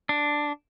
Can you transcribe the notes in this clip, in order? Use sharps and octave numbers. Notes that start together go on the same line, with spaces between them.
D4